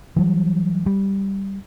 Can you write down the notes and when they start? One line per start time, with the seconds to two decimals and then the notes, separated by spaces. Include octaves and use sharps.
0.16 E3 F#3 G3
0.86 G3